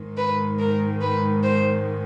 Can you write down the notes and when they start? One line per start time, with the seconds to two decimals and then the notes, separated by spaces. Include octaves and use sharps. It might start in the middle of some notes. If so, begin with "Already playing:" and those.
Already playing: G#2 D#3 G#3
0.17 B4
0.59 A#4
1.01 B4
1.43 C5